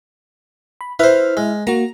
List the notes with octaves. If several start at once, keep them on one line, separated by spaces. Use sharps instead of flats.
B5
E4 B4 C5 E5 F6
G#3
A#3 F#4 A#5